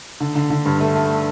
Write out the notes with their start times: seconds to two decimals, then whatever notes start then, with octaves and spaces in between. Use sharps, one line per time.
0.21 D3
0.36 D3
0.50 D3
0.66 G2
0.80 A3
0.96 A3